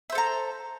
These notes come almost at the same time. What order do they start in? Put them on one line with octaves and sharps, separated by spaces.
E5 C5 A4 A#5